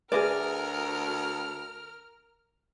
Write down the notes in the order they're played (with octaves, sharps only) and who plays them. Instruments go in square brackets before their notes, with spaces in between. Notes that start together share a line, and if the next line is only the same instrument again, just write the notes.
[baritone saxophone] D2 [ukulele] G#4 D5 [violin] A#4 F6 [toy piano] B4 E5